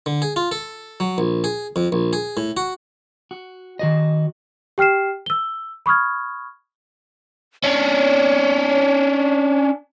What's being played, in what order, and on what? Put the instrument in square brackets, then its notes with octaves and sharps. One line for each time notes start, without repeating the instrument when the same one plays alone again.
[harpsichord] D3
G#4
F4
A4
F#3
A#1
G#4
F2
A#1
G#4
A2
F#4
[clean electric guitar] F#4
D#3 F#4 D#5
[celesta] G4 G5 F6 C7 E7
E6 G7
B5 C#6 D#6 F6 G#6
[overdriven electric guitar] C#4 D4 [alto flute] C#5